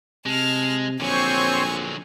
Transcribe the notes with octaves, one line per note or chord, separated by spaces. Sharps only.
C3 G#3 A5 F6
A#1 D3 F#3 C4 C5 C#5 G#5 C#6